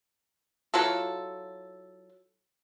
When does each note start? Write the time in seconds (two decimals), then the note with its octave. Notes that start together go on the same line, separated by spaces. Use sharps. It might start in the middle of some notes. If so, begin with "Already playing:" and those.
0.74 F#3 E4 F4 A4